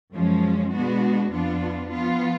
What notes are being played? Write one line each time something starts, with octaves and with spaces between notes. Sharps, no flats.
F#2 F3 G#3 C#4
B2 G#3 B3 D4 F#4
F2 F3 B3 D4 F4
F3 B3 F4